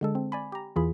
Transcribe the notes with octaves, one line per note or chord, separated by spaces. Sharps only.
D3 G#3 A4
C4
D5 G#5 B5
G4 A#5
E2 E3 F4 G#4 B5